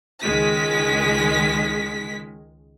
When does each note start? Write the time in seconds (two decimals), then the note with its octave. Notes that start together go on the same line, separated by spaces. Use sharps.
0.22 C#2 D#3 G#3 B6